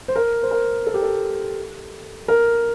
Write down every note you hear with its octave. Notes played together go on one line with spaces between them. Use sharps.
C5
A#4
C5
A#4
A4
G4
A4
A#4